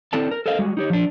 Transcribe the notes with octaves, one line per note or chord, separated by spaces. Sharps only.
C4 E4 A4 D5 A5
A#4
A4 A#4 C5 D#5 F5
G3 G#3 F#4 G#4
D#4 G4 C#5
F3 D4